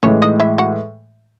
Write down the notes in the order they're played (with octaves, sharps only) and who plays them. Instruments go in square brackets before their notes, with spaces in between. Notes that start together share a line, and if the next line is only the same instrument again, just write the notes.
[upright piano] A2 E3 G#3 [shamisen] C#4 C#5
[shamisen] D#4 D#5
E4 E5
F#4 F#5